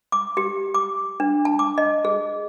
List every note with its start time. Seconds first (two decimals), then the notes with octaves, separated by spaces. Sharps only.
0.12 D6
0.37 G4
0.74 D6
1.20 D4
1.45 A5
1.59 D6
1.78 D#5
2.05 G#4